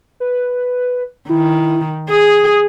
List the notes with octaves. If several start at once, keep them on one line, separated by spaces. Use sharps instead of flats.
B4
D#3 E4
G#4 D#6